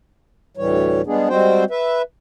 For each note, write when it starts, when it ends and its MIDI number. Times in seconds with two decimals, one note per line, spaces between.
0.57 1.02 38
0.57 1.02 45
0.57 1.02 52
0.57 1.02 55
0.57 1.02 73
1.06 1.29 55
1.06 1.29 56
1.06 1.29 59
1.06 1.29 62
1.06 1.29 68
1.29 1.64 55
1.29 1.64 56
1.29 1.64 60
1.29 1.64 66
1.29 1.64 72
1.29 1.64 79
1.70 2.02 71
1.70 2.02 76